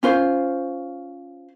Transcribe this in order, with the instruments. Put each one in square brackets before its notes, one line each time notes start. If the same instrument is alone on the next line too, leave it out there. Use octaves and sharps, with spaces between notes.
[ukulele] C#4 F4 C5